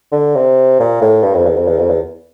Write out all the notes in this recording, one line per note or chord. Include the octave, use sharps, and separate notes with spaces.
D3
C3
A#2
A2
G2
F2
E2
F2
E2
F2
E2